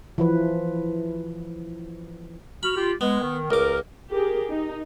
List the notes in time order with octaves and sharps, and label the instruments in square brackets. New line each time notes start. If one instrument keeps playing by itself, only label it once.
[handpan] E3 F3 B4
[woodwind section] F#4 F6 [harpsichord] B5
[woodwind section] F4 G4
[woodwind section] G#3 [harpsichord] B3
[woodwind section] D#3
[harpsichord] C#2 D6 [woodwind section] A#4
[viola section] G4 G#4 A#4
D#4